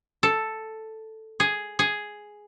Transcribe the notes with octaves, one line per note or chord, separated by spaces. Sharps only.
A4
G#4
G#4